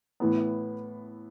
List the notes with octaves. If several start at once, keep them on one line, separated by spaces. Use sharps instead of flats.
A2 E3 B3